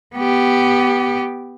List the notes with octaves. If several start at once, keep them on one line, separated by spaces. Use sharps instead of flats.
B3 G4